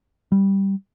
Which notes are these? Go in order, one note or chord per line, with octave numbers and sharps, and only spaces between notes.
G3